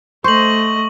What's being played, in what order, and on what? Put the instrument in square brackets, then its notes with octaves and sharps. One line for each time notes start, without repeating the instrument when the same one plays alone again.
[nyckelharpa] A3 D#5 [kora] C5 [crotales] C#6 F#7